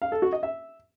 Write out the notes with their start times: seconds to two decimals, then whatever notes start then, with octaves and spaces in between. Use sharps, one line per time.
0.02 F5
0.12 A4
0.22 F#4
0.33 D#5
0.43 E5